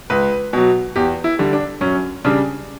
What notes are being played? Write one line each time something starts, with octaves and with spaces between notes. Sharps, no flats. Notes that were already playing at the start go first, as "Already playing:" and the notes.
C#2 B4
B2 F#3
E2 G4
E4
D3 G3
D4
F#2 C#4
C#3 G3 D4